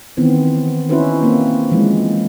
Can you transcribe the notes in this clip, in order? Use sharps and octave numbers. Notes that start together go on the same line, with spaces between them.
D#3 E3 B3 C4
C#4 D#4 E4 F#4 B4 C5
A#3 C4
E3 F3 G#3 C#4